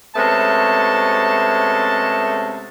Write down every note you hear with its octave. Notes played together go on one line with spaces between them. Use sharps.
C3 G#3 A3 B3 C#4 A5